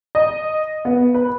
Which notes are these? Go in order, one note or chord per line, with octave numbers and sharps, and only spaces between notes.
D#5
B3
B4